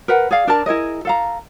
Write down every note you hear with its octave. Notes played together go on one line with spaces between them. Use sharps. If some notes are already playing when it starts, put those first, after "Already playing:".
A#4 B4 F#5
G#4 D5 F5
D4 A#4 D5 A5
E4 G#4 A#4 D#5
A4 F5 A#5